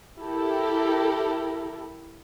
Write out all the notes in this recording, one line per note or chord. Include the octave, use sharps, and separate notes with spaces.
E4 G4 A4 A#4